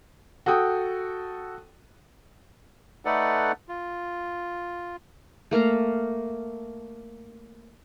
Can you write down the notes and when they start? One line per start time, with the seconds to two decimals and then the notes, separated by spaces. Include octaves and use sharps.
0.46 F#4 A4 G5 D#6
3.05 A3 D#4 A4 B4 D5 F#5
3.69 F4
5.51 A3 A#3 F5 A#5